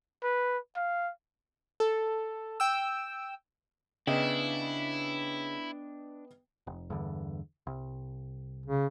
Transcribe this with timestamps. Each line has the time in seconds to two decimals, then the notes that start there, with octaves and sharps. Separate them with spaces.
0.23 B4
0.76 F5
1.80 A4
2.60 G5 E6
4.07 C#3 B3 D4 E4 D#5 G5
6.67 F1
6.90 E2 G2 D3
7.67 C2
8.66 C#3